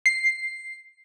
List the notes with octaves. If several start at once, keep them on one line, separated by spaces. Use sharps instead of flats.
C7